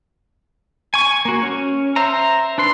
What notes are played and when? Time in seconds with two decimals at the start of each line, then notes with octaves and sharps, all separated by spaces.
0.94 G#5 C#6
1.25 A#3 F#4
1.43 C#4
1.96 C5 E5 A#5
2.58 D4 B4 C6